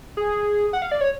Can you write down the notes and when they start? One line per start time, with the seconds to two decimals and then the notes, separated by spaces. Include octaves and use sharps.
0.17 G#4
0.73 F#5
0.82 F5
0.92 D5
1.01 C#5